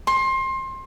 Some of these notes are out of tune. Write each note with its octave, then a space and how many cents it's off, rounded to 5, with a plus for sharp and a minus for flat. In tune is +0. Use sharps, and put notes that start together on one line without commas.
C6 +25